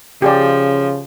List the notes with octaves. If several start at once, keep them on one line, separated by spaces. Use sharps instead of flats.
C#3 F3 G4 G#4 D5